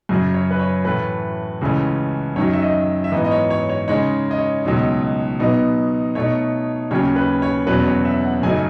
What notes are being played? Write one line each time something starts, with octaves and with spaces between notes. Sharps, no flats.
F#2 C#3 F#3
C#5
B4
C#5
A2 E3 A3 B4
C#2 C#3 E3 A3 C#4
F#2 D#3 F#3 C#5
E5
D#5
E5
G#2 E3 B3 D#5
D#5
C#5
C#5
C#5
C#3 G#3 D#4 C#5
D#5
C#5
C#2 B2 F#3 A3 D#4
B2 F#3 B3 D#4
B2 A3 D#4 C#5
D#2 C#3 F#3 C#4 C#5
B4
C#5
E2 B2 F#3 C#4 B4
C#5
E5
F#5
F#2 C#3 F#3 A3 D#4 G#5